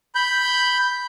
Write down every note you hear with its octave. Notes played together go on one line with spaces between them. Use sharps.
B5 G6